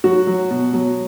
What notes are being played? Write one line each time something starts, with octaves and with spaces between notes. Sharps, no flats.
F#3 F#4
F#3
B2
F#3